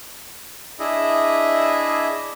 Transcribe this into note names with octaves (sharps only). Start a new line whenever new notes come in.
D4 E4 G#4 D#5 E5